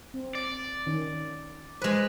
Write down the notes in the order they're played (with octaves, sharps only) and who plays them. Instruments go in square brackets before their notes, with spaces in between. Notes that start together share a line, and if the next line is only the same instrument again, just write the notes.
[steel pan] C4
[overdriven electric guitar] D5
[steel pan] D#3 C#4 C#5
[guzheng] G#3 B4 [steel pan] C5